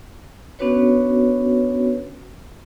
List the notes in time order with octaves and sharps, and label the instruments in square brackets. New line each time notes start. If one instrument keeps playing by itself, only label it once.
[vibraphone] B3 C#4 D4 F#4 B4 C#5